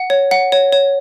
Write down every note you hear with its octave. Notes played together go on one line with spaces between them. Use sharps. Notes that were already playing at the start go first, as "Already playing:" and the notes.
Already playing: F#5
C#5
F#5
C#5
C#5